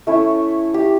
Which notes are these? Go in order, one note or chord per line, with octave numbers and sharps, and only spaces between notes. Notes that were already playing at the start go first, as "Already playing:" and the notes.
A3 C#4 E4
G4